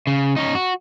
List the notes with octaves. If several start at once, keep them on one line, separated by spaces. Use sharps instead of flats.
C#3
C#4 D#4
F#4